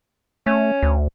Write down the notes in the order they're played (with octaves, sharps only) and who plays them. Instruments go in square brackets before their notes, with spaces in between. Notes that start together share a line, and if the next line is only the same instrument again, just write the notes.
[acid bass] A3 [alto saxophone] C#4
[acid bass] D2